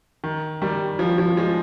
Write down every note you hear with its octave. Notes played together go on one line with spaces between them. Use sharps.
D#3
D#3 G3
F3
F3
F3 G#3